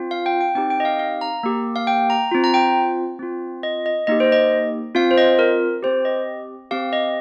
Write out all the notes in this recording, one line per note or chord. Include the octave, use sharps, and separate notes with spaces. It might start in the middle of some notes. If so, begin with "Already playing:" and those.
Already playing: C4 F4
F5
G5
G5
C4 D#4 G4 G5
G5
D#5
F5
F5
A#5
A#3 G4
F5
G5
A#5
C4 F4
A#5
G5
C4 F4
D#5
D#5
A#3 D#4 G4 D#5
C5
D#5
C4 F4 F5
C5
D#5
A#4
C4 G4 C5
D#5
C4 G4 F5
D#5